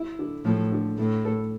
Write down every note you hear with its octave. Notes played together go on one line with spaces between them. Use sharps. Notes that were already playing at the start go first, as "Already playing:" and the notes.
Already playing: E4
D3
A2 F3
D3
A2 A3
A4